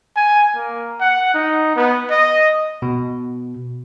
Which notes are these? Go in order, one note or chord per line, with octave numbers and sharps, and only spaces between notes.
G#5
A#3
F#5
D#4
B3
D#5
B2